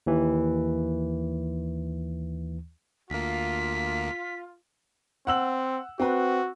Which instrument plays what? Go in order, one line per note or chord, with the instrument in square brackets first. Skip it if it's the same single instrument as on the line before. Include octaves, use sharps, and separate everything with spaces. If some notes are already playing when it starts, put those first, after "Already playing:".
[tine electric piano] D#2 E3
[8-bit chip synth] D2 A#3 [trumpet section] F4 [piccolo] B6
[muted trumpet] C4 [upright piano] F#5 E6 F#7
[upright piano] C4 B4 [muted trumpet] F#4